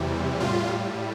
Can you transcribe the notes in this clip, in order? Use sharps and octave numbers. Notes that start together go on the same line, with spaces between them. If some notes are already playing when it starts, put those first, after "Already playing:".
Already playing: E2 C3 E3 G3
A2 G3 F4